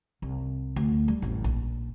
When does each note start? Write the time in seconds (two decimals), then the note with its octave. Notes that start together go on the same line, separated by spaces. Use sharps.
0.22 C2
0.76 D2
1.08 G3
1.22 A1 F2
1.44 A#1